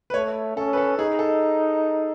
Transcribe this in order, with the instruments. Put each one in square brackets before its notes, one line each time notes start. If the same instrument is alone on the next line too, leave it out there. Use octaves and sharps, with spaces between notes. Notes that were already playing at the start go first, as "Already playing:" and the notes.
[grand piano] B4
[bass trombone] A3 [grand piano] C#5
[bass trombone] C#4 [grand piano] A4
[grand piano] B4
A4
[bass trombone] D#4 [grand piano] G#4
[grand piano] A4